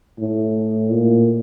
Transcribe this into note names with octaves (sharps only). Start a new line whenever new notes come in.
A2
A#2